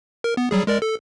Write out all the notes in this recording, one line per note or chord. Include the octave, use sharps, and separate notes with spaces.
A#4
B3
F#3 G3 G#4
G#3 A#4 D5
A4